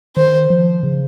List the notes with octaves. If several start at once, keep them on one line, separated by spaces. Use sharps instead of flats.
D#3 C5
F3
C#3